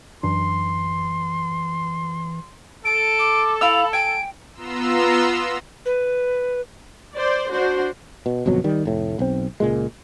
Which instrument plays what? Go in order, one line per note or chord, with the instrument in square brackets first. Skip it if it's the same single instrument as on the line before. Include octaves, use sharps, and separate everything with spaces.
[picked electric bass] F#2 D4 [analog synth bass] E3 [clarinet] C6
[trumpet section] A4 [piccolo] D7
[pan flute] D6
[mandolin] E4 F5 E6 [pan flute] B5 [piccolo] F7
[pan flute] G5 [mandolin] G#5 [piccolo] D7
[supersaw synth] B3 F4 A#5 C6 E6
[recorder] B4
[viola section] C5 D5
D4 F#4 C5
[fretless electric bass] B2
G1 F2 B2 F#3
D#3 G3
F1 A2
B1 C4
C#2 A#2 G#3